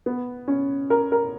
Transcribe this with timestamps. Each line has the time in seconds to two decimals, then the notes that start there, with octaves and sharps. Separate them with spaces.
0.06 B3
0.48 C#4
0.90 A#4
1.12 A#4